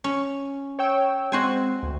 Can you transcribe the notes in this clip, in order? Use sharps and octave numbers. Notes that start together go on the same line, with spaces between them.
C#4
C#5 G5 E6
G#3 C4 F#4 C5 G#5
D2